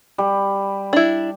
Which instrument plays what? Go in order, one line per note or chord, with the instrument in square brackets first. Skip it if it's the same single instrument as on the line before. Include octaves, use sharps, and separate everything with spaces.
[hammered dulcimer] G3
[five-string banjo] D4 E4